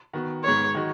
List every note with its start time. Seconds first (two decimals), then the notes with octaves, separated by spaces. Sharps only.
0.13 D#3 B3 F#4
0.44 G#2 G#3 B3 C#5
0.75 D#3 G#3 D#4 F#4